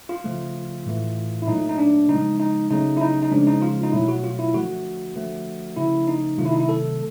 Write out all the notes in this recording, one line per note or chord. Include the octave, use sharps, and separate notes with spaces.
F4
C#3 F3 A3
A2 E3 A3
E4
A#2 F#3 A3 D#4
D#4
D4
C#3 F3 G#3 D#4
D#4
C#3 F#3 A3 D#4
E4
D#4
D#4
C#3 F3 G#3 D4
D#4
F4
D#4
B2 F#3 A3 E4
F#4
F4
E4
D3 F3 A3 F#4
D3 F3 A3
C#3 F3 A3 E4
D#4
C3 D#3 F#3 A3 F4
E4
D#4
E4
A4